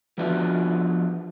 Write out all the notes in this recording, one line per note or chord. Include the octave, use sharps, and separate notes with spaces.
F3 G3 B3 D4 F4 F#4